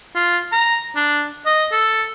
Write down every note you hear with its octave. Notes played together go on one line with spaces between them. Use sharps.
F4
A#5
D4
D#5
A4